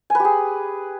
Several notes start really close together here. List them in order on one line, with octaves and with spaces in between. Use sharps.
G#5 B4 G4 G#4